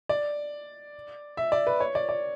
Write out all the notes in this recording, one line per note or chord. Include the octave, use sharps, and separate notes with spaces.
D5
E5
D5
B4
C#5
D5
D5